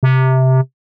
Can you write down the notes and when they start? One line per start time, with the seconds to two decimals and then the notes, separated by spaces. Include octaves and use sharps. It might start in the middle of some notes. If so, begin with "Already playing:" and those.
0.03 C3